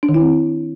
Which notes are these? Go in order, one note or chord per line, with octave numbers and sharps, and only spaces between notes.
D4
D#3
E4
C4